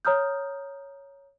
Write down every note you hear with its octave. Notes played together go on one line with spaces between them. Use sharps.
C#5 A#5 D#6 F6 G6